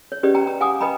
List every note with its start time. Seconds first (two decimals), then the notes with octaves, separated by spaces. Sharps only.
0.12 C#5
0.23 C#4 G4 B4 D5 D#5
0.35 G5 A#5
0.47 A#5
0.61 F5 F#5 G#5 D6 D#6
0.81 B4 D#5 G5 A#5 B5